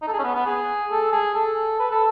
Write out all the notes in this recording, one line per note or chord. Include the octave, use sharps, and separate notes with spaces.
D#4
A4
G#4
C#4
B3
B3
G#4
A4
G#4
A4
B4
A4